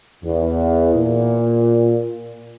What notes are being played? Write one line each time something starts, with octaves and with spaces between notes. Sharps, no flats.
E2
A#2